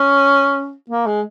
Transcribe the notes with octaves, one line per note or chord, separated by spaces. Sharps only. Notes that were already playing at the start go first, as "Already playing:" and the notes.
Already playing: C#4
A#3
G#3